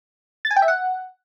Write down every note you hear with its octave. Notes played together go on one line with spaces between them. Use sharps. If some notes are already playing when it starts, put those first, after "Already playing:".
A6
G#5
G5
E5
F#5